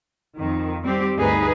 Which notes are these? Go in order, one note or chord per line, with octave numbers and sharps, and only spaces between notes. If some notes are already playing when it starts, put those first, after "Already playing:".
F2 D#3
G3 C4 G4
D2 G2 D#4 G#4 B4